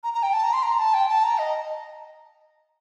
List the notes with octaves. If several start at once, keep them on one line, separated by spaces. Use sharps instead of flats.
A#5
A#5
G5
A5
A#5
C6
A#5
A5
G5
A5
A#5
D#5